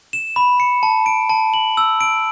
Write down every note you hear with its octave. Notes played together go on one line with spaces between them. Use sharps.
E7
B5
C#7
A5
D7
A5
F#7
E6
D7